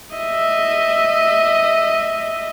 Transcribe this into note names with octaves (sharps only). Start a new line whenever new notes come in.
D#5 E5